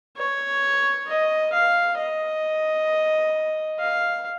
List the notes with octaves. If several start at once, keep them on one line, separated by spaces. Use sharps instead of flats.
C#5
D#5
F5
D#5
F5